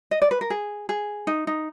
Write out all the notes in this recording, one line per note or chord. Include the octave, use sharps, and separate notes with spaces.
D#5
D5
B4
A#4
G#4
G#4
D#4
D#4